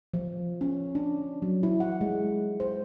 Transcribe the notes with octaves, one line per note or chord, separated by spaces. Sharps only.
F3
C#4
D4
F#3
E4
F#5
G#3
C5